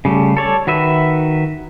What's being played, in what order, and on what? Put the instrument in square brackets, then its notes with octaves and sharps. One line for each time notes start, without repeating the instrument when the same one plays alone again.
[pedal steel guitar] C#3 G3 A3
A4 C#5 D5
D#3 F#4 B4 E5